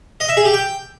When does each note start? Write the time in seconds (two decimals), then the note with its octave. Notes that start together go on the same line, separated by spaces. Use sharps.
0.20 D#5
0.29 E5
0.37 G#4
0.45 G4
0.54 G5